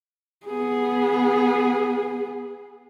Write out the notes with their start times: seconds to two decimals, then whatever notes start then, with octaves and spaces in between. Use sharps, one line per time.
0.47 B3 G#4